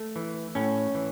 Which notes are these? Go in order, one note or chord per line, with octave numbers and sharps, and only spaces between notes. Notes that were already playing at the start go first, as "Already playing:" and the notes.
Already playing: A3
E3
A2 C#4
E3